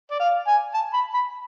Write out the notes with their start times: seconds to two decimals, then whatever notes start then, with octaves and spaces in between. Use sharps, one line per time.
0.11 D5
0.20 F5
0.47 G#5
0.74 A5
0.94 B5
1.14 B5